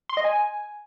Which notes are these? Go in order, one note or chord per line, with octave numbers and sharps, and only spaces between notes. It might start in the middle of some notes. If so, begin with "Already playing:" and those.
C6
D#5
G#5